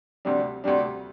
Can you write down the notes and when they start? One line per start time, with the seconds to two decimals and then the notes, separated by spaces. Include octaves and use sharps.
0.25 D2 C3 G3 D4
0.64 D2 C3 G3 D4